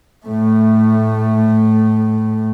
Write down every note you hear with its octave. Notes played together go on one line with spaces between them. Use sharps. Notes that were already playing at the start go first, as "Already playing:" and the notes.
A2 A3